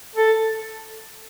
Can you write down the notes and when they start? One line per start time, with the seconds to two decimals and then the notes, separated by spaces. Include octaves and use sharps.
0.16 A4